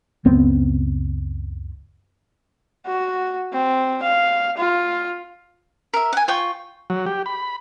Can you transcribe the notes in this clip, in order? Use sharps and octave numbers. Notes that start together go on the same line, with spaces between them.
F#1 C#2 B3 C4
F#4
C4
F5
F4
A#4 E5
F#5 G#5
F4 G5 C#6
F#3
G4
B5